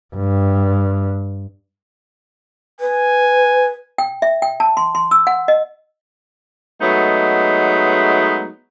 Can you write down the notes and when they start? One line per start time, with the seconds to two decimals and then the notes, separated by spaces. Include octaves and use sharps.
0.15 G2
2.80 B4 G#5
3.98 G5
4.22 E5
4.42 G5
4.60 A5
4.77 C6
4.95 C6
5.11 E6
5.27 F#5
5.48 D#5
6.81 F#3 G#3 A3 B3 D#4